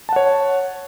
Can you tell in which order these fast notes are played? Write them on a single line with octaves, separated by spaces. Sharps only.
A5 F#5 C#5